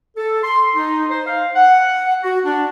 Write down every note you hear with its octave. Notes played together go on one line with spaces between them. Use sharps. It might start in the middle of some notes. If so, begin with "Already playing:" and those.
A4
C6
D#4
C5
F5
F#5
F#4
D4